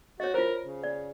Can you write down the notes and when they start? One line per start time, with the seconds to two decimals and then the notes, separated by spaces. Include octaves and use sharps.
0.20 F#4 C#5 D#5
0.34 F4 A#4 C5
0.63 C#3
0.84 D5